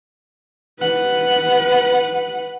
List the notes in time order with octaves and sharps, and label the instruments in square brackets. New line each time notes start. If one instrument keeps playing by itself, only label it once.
[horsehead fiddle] B4 F#5